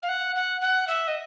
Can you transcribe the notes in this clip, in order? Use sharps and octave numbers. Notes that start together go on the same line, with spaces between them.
F5
F#5
F#5
F#5
E5
D#5